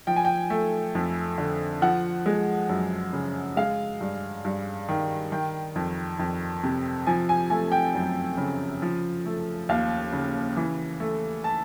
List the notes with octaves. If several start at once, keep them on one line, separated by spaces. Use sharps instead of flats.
F3 G5
G#5
G5
A3
F2
D3
F3 F#5
G#3
F#2
C#3
G#3 F5
G2
G2
D#3
D#3 G5
F2
F2
C3
F3 G#5
G#5
A3 G#5
G5
F#2
C#3
F3
A3
D#2 F5
C#3
E3
A3
A5